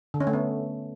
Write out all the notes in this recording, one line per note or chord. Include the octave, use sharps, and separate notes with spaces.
D3
C#4
A3
B3